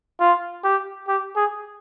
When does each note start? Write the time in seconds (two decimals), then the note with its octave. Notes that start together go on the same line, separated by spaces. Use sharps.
0.20 F4
0.64 G4
1.08 G4
1.36 G#4